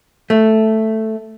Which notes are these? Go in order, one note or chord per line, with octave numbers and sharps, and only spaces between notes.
A3